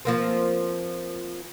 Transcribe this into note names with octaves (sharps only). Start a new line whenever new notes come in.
F3 A#3 C4